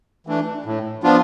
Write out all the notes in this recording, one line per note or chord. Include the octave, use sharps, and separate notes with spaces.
E3 A3 D4
A2
F3 B3 D4 F4